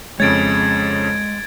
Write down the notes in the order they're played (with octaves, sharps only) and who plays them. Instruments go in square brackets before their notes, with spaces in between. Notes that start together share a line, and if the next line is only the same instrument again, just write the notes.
[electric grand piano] F2 C#3 C#5 [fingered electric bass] G#3 [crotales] G#6 A6 D7